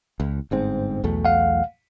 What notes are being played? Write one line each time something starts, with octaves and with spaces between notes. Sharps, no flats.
C#2
G1 G#2 C4
B1 E2 A3
F5 F#5